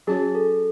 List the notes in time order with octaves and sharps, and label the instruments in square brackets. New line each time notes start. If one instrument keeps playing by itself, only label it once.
[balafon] F#3 C#4 F#4 C#5 [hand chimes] G#4
[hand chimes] A4